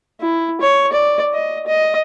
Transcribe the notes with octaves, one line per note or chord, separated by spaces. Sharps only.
E4
C#5
D5
D#5
D#5